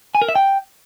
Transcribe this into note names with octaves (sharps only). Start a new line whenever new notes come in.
G#5
A#4
E5
G5